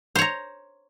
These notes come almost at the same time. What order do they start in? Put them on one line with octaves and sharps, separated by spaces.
C5 C#5 A#5